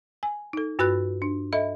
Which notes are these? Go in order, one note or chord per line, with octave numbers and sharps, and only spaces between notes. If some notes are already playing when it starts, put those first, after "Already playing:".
G#5
D#4 A4
G2 F#4 B4 B5 F#6
D4
A4 D#5 E5 B5